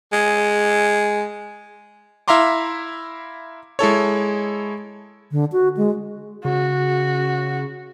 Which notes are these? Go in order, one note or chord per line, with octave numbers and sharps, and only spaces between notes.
G#3
E4 E5 F5 A#5 C6 D6
G#3 E4 A4 C#5
D3
F#4
G#3
C#3 F#4